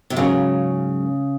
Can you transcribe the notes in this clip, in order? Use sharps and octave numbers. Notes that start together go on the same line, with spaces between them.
C3
G#2 C#3 F#3 A#3 C#4